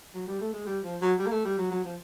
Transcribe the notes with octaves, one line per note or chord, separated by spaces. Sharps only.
F#3
G3
A3
G#3
G3
F3
F#3
G3
A#3
A3
G3
F#3
F#3
F3